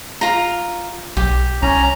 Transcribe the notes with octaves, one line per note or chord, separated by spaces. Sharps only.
F4 A#5
B1 G4
C2 C#4 A#5